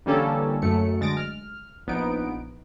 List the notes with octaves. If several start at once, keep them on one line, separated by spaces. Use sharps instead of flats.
D3 E3 G3 A#3 C#4 A4
F#2 A3 C#7
D2 G#3 A6 A#6 D7
F6
A#1 B3 D#4 D7